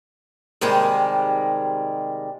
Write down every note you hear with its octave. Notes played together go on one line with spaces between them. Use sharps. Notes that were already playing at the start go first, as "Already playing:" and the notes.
C3 D#3 G3 G#3